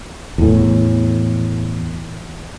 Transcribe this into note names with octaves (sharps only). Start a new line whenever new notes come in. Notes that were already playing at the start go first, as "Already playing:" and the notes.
E2 A2